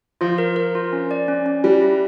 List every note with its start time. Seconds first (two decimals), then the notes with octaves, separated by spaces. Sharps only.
0.21 F3 F4
0.38 A#4
0.56 A#4
0.75 F4
0.93 C#4
1.11 D5
1.28 C#4
1.46 C#4
1.64 G3 E4
1.82 E4